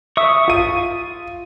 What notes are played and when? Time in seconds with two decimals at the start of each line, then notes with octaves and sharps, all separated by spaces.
0.17 E5 C#6 D#6
0.48 F4 D#7